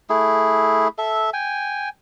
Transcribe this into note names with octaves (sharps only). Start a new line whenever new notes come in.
A3 E4 G#4
A4 E5
G5 G#5